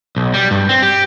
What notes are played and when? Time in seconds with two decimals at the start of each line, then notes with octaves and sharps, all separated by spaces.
0.17 B1
0.34 G3
0.51 G2
0.69 C4
0.83 G4